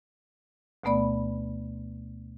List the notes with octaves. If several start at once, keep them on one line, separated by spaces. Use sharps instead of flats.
D2 B2 A3 B3 D5 B5